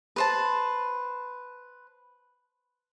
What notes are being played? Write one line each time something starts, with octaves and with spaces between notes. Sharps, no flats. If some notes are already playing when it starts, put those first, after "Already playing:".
B4 C5 A5